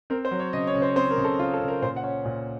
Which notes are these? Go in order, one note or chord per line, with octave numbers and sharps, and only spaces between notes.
C4 A#4
C5
F#3
C#5
C#3 D#5
C#5
C#3
C5
C4 C5
A#4
C#3
A4
C#3 F4
A4
C#3
A#4
A#2 C5
F#5
C#4
A#2